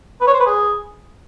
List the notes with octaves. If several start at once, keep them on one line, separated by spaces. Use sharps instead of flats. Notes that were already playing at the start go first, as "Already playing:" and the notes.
B4
C#5
C5
B4
G#4